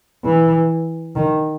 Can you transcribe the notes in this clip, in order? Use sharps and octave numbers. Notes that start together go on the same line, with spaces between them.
E3
D#3